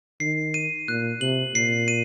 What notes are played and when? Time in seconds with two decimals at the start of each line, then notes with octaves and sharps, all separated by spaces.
0.20 D#3 C7
0.54 D#7
0.88 A#2 F#6
1.21 C3 F#7
1.54 A#2 C7
1.88 D#7